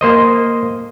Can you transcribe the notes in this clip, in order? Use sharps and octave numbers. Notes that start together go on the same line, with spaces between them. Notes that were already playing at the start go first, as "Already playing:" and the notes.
A#3 C5 D#5